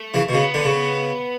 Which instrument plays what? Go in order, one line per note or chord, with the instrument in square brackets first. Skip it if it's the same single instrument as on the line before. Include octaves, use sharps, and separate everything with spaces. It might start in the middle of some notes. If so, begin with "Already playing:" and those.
Already playing: [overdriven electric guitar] A3
[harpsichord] C#3 E3
B2
[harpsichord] C#3 [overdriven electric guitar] B3
[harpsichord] D3
C#3